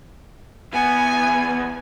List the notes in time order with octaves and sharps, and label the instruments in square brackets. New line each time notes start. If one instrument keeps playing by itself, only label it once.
[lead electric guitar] E2 B3 [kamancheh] G#5